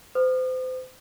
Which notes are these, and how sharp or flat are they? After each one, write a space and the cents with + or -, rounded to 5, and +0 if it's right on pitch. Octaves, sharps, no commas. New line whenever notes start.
C5 -35 D#6 -40